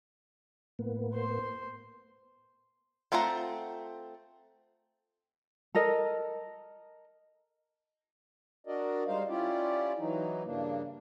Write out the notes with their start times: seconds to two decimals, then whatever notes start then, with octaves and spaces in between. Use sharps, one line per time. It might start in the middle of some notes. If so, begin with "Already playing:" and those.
0.79 A2 A#3 B3
1.13 C5 C6
3.12 A3 C4 F4 F#5 A#5
5.75 A4 A#4 D#5
8.67 D4 F#4 A#4 D5 D#5
9.07 G3 G#3 D#4 C5 F5
9.29 C#4 E4 F4 G4 D5
9.99 E3 F#3 D#4
10.45 G2 C#3 A#3 D4